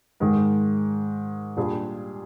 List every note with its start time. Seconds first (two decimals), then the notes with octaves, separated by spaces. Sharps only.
0.20 G#2 D#3 G#3
1.57 A#2 G3 D4 G#4